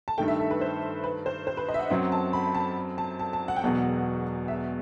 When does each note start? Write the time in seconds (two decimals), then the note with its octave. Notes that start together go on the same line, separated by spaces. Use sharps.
0.08 A5
0.18 G2 D#3 A3 G5
0.28 E5
0.39 A4
0.51 B4
0.61 C5
1.04 B4
1.26 C5
1.47 C5
1.57 B4
1.68 D#5
1.74 E5
1.79 F#5
1.90 F#2 F#3 C4 F#5
2.12 A5
2.33 B5
2.55 A5
2.98 A5
3.19 A5
3.33 A5
3.48 F#5
3.56 G5
3.63 E1 E2 B2 F#3 F#5
4.48 E5